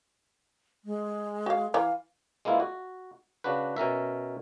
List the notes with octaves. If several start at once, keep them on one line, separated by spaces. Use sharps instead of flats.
G#3
F#4 F5
E3 F5 A#5
G#3 A#3 B3 E4 F4
F#4
C#3 D4 F#4 B4
B2 C#4 A#4 E5